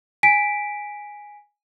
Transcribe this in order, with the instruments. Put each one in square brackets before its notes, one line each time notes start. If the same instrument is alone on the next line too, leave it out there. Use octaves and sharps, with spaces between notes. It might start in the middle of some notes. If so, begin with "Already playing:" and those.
[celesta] G#5 B6 D7